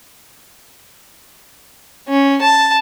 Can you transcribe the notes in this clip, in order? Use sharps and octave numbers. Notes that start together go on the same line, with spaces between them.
C#4
A5